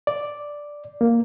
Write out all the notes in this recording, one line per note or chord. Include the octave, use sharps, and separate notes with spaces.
D5
A#3